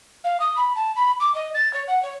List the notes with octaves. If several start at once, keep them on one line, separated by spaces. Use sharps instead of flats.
F5
D#6
B5
A5
B5
D6
D#5
A6
C#5
F#5
C#5